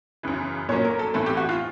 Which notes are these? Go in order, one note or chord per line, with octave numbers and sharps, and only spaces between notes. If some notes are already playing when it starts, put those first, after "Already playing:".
F#2 C#3 E3
A#2 F#3 A#3 C#4 C#5
A#4
A4
A2 E3 A3 C4 A4
G4
F#4
F4